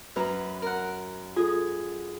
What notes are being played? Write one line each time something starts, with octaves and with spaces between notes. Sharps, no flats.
F#2 B4 A#5
A#4 F#5
F4 G#4 A4